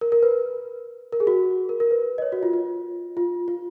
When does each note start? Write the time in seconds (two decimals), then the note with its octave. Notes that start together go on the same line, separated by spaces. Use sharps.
0.01 A#4
0.12 A#4
0.23 B4
1.13 A#4
1.20 G#4
1.27 F#4
1.69 A#4
1.80 A#4
1.91 B4
2.18 D#5
2.22 C#5
2.32 F#4
2.43 F4
2.53 F4
3.17 F4
3.48 F4